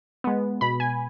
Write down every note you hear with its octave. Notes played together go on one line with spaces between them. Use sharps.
G#3 B3
B2 B5
G#5